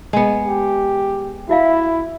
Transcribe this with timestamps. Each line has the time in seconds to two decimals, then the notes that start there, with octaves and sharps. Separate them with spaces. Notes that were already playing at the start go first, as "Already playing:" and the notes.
0.13 G#3 B3
0.46 G4
1.49 E4 F#4 E5 F5